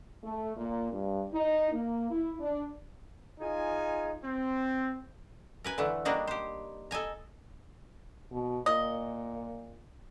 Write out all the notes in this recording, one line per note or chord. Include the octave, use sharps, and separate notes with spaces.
A3
A#2
G2
D#4
A#3
E4
D4
D#4 F4 G#4 G#5
C4
A#4 B4 G#5
D3 E3 A3
G3 A#3 D4 D#4 F#4
G4 C5
A4 D#5 G#5 A#5
B2
A#2 D#5